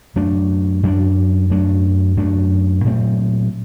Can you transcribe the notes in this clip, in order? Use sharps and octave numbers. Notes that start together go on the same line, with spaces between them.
F#2 F#3 A3 D4
F#2 F#3 A3 D4
F#2 F#3 A3 D4
F#2 F#3 A3 D4
A#2 F#3 A3 C4